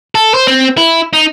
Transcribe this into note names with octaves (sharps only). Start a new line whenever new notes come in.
A4
C5
C4
E4
D#4